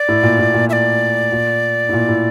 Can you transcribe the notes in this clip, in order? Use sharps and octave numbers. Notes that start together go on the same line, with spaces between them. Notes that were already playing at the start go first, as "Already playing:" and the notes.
Already playing: D5
A2
A#2
A2
A#2
E5
D5
A#2
A2
A#2
A2